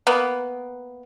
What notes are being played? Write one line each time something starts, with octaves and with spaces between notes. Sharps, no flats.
A#3 B3